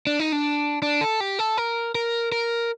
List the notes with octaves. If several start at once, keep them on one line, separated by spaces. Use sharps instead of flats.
D4
D#4
D4
D4
A4
G4
A4
A#4
A#4
A#4